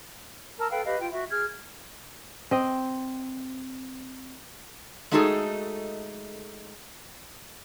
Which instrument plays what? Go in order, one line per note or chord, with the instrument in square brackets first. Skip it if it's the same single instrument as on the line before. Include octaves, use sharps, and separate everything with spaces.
[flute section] A#4 A5 E6
A4 B4 F5 G5
G4 B4 D#5 F5
F4 G5
F#4 E5
G#4 F6 G#6
[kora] C4 D#5
[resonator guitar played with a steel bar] G#3 A3 D#4 F#4 G#4 A4